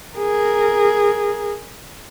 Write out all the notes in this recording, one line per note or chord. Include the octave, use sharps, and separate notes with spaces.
G#4 A#4